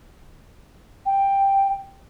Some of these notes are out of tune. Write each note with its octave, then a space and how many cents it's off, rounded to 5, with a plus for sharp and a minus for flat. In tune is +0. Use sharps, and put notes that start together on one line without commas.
G5 +5